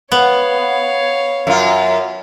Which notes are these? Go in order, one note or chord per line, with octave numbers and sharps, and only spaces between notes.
B3 C#5 F5
F#2 F4